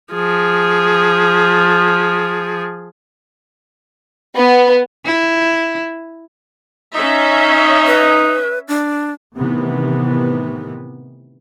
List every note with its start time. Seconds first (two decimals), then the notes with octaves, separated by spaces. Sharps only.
0.14 F3 G#4
4.37 B3
5.05 E4
6.94 C#4 D#4 E5
7.87 B4
8.68 D4
9.35 A2 C3 D#3 E3 B3